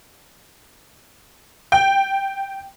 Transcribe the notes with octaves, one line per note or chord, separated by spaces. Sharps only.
G5